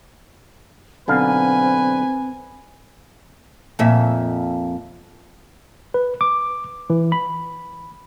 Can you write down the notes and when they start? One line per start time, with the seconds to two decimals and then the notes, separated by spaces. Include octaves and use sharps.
1.08 B1 D3 C4 B4 F5 G#5
3.79 F2 A#2 E5
5.94 B4
6.21 D6
6.90 E3
7.12 B5